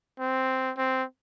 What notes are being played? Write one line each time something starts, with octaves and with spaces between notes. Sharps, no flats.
C4
C4